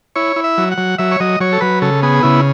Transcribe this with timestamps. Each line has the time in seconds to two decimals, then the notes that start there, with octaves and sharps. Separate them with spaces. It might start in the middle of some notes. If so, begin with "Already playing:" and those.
0.16 E4 C#5
0.36 E4
0.44 E5
0.58 F#3
0.72 F#5
0.78 F#3
0.98 F#3 E5
1.12 C#5
1.20 F#3 D#5
1.40 F#3 C#5
1.53 A4
1.61 F#3 B4
1.82 C#3 A4
2.02 B3 G#4
2.23 C#3 E4